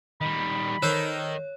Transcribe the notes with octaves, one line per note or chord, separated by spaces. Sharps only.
D#3 G3 B5
D#3 A4 A#4 C5 C#5